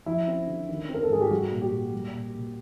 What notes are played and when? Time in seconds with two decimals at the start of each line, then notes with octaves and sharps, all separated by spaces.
0.06 F3 E4
0.27 C4
0.47 D3
0.69 D#3
0.89 C4
0.94 A#4
1.03 A4
1.09 G#2 G#4
1.21 G4
1.30 G3 F#4
1.52 A#2
1.62 G4
1.72 A#2
1.92 G3
2.14 A#2
2.35 A#2